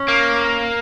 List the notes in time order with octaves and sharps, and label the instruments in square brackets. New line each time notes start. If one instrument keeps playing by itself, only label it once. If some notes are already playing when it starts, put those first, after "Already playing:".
Already playing: [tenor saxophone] C#4
[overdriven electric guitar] A#3